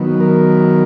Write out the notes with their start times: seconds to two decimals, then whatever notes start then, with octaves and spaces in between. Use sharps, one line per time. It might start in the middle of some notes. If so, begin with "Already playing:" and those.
Already playing: D#3 F#3 B3
0.20 A#4